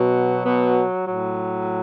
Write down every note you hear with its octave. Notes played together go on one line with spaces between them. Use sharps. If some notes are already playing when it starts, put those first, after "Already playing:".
Already playing: B2 F#3
B2 B3
A2 F#3